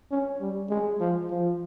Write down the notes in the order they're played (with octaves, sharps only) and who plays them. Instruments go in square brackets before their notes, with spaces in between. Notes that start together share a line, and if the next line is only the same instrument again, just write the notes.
[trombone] C#4
G3
G#3
F3
F3